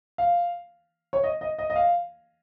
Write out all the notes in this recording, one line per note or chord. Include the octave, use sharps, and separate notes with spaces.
F5
C#5
D#5
D#5
D#5
D#5
F5